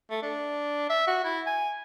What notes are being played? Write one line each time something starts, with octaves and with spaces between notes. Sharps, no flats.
A3
D4
E5
F#4
E4
G#5